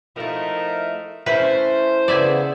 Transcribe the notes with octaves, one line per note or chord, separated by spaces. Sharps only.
F3 A3 D#4 E4 A#4
A3 C#4 E4 B4 C5
C#3 B3 D5 E5 G#5